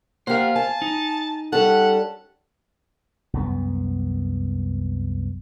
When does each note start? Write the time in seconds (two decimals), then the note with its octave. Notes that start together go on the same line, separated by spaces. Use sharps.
0.27 A#3 G4 C5 F5 F#5
0.56 G#5 A5
0.82 D#4
1.52 G3 C#4 A4 F#5
3.33 C2 F#2 B3